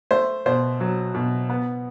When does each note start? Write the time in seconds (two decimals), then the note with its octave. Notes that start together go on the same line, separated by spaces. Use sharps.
0.11 A3 C5
0.46 B2 C5
0.80 F#3
1.14 B2
1.49 B3